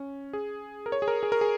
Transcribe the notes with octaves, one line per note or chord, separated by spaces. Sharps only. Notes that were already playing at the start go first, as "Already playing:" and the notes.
Already playing: C#4
G#4
A#4
C#5
G#4
A#4
G#4
A#4
G#4